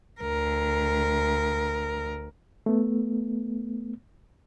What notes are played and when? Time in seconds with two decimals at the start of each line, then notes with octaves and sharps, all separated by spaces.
0.21 D2 A#4
2.66 A3 B3